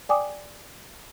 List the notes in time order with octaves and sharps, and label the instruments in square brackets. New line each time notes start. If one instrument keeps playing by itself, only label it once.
[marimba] D5 G5 G#5 D6 D#6